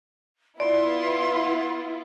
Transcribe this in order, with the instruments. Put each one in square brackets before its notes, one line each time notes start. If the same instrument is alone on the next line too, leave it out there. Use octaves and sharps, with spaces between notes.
[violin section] B3 E4 F4 [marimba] D5 [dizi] C6